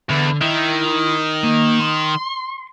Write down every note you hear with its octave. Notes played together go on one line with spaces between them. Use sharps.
E2 D3
D#3 E4
A#3
C6